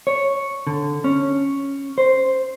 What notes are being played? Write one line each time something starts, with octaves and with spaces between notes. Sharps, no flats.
C#5
D3
C#4
C5